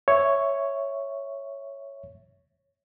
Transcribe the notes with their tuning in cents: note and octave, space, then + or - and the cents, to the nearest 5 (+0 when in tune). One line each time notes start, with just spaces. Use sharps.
C#5 +0 E5 +0